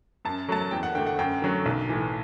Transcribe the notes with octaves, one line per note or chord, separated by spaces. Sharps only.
F#2 A5
F#3 A3 A5
E2 G5
F#5
D3 A3 G5
F#5
F#2 G5
D3 F#3 A3
B1
A2 E3